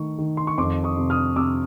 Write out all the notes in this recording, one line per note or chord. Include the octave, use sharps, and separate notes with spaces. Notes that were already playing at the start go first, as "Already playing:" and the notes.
Already playing: D#3 A3 C#6
D#3
C6
C#6
F2 C6 D6
C#6 D#6
C3
D#6 F6
C3 D6 E6